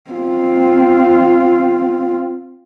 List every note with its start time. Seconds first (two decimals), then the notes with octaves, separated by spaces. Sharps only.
0.11 C4 F4